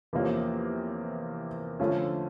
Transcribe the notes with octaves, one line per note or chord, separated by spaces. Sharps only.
E2 C3 F3 A#3 C#4
D3 F3 A3 C#4 F4